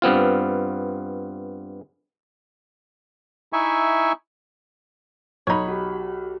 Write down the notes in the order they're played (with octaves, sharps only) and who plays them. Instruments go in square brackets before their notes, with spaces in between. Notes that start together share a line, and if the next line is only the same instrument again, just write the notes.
[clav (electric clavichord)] G2 B3 C4 F4
[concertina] D#4 E4 E5 G#5 C#6
[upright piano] B1 B5 [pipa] D#4 C#5
[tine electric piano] F#4 G4